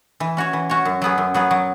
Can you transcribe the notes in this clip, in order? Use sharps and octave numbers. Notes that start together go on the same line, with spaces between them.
E3
C#4 F#4 C#5
E3
C#4 F#4 C#5
F#2
F#3 B3 G#4
F#2
F#3 B3 G#4
F#3